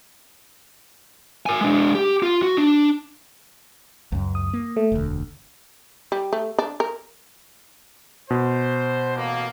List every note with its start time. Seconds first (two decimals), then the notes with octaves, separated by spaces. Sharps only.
1.46 A#4 G#5
1.61 G#3 D4
1.95 G4
2.23 F4
2.42 F#4
2.58 D4
4.12 C#2 F#2
4.35 D#6
4.53 A#3
4.76 A3
4.92 E1 D2
6.12 G3
6.33 A3
6.58 D4
6.80 A#4
8.30 B2 C5
9.16 A1 A#3